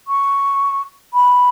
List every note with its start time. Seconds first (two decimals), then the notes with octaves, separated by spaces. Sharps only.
0.07 C#6
1.14 B5